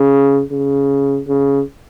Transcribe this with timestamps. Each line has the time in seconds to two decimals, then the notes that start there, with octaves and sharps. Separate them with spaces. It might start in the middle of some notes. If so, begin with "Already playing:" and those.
Already playing: C#3
0.51 C#3
1.28 C#3